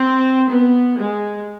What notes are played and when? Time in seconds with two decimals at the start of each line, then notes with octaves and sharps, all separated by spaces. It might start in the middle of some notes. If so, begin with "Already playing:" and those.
Already playing: C4
0.48 B3
0.95 G#3